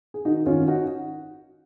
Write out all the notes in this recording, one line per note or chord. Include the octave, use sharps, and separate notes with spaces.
G#4
D#3 D#4 F#4
G#1 C#4 F4
D#4 F#4